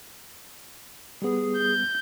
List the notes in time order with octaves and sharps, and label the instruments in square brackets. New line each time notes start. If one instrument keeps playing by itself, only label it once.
[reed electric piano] G3 B3 [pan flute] G#4
[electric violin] G6